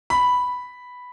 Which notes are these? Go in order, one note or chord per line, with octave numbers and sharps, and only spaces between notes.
B5